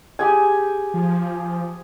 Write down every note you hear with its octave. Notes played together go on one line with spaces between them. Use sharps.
G4 G#4 G#5
F3